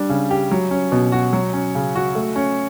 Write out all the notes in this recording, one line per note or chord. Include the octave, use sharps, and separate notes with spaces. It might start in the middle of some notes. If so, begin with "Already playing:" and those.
Already playing: G3 D4
C#3
G4
F#3
C#4
B2
F#4
F#3
C#4
C#3
F#4
A3
C#4